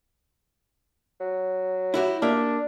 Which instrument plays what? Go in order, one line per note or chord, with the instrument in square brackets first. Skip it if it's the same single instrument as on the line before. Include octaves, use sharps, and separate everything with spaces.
[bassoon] F#3
[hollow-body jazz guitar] E4 F#4 G4
[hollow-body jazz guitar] A#3 G4 E5 [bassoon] D4